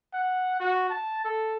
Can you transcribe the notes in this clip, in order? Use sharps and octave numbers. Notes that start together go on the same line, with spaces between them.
F#5
F#4
A5
A4